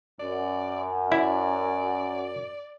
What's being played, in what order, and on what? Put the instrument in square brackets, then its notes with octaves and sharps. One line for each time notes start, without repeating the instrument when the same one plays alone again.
[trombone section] F#2 [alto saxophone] D5
[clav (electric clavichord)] E4 [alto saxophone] D5